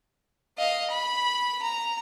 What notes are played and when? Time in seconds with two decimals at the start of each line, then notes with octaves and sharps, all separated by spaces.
0.58 D#5 F5
0.91 B5
1.63 A#5